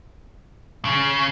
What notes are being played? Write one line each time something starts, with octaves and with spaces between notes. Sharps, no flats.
C#3